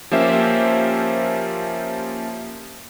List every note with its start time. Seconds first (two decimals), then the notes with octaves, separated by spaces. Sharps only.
0.11 F3 A#3 C#4 G4 C5 E5